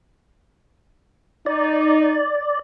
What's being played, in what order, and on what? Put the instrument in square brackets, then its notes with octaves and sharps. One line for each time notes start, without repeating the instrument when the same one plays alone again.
[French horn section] D#4 [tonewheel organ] D5